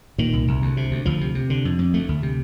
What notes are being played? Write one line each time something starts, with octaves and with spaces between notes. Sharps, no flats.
A#2 D#3
C2
C2
D2
C3
D2
D2 F3
C3
C3
D3
F2
F2
D2 A3
D2
C3